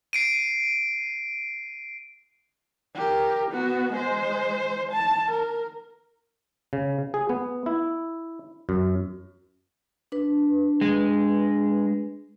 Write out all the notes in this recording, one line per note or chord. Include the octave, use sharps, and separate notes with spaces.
C7 D7 D#7
G4 A#4
B3 F#4
G#3 C5
A5
A#4
C#3
G#4
B3
E4
F#2
D4 B4
G#3